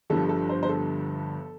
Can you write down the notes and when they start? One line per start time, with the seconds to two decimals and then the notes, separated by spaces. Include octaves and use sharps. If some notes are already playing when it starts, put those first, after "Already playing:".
0.10 G1 G2 D3 F3 A4
0.29 A4
0.49 C5
0.63 C5
0.69 A4